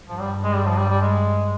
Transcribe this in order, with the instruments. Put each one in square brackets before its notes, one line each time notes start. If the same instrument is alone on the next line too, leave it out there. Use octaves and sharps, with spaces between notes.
[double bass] G2 [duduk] F3
[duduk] G3
G#3
G3
F3
G3
G3
G#3